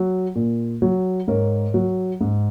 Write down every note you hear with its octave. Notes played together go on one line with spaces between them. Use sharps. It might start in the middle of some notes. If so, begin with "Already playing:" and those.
Already playing: F#3
A#2
F#3
G#2 A#4 C#5
F#3
G#2